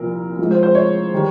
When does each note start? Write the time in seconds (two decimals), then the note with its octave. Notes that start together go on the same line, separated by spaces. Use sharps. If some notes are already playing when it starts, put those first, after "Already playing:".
Already playing: C2 A#2 F3 A#4
0.39 G#2 F3
0.51 C5
0.63 C5
0.75 C#5
1.14 D#3 G3